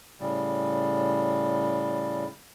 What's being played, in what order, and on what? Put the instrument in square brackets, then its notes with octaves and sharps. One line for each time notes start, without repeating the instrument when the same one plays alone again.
[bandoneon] A2 C#3 G3